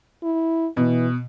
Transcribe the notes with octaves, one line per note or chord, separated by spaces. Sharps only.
E4
B2 E3